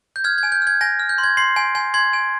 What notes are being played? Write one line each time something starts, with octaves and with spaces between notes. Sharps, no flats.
G6
F6 G#6
G#6
G#5
G6
F6
G#6
G#5 A#6
F6
G6
C6
G#6
C6 C7
G#5
G#5
C6 G#6
G#5